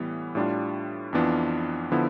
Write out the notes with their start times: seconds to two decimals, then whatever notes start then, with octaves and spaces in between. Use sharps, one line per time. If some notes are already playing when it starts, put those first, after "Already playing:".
Already playing: A2 E3 G3 B3
0.35 A2 G3 D4 F4
1.13 F2 E3 B3 D4 F4
1.92 D3 F3 B3 E4